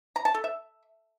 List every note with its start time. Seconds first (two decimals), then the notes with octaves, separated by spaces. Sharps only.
0.16 A#5
0.25 A5
0.34 A4
0.44 E5